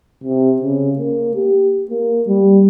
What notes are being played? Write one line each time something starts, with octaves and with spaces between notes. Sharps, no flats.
C3
C#3
A#3
G4
A#3
G3